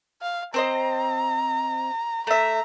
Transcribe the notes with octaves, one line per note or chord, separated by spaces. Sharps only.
F5
C4 C5 D#5 A#5
A3 E5 A#5